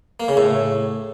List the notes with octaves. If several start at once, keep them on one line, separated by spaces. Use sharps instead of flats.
A#3
C#3
A2